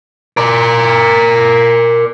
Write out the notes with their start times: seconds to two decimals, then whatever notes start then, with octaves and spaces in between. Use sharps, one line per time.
0.37 A#4 D5